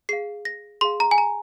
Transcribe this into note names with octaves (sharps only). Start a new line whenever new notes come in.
G#4 F5 C7
A#6
G#4 F5 C6
A#5
G#5
A#5